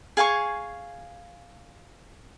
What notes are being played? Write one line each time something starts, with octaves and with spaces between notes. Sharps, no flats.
G#4 F5 G#5 C#6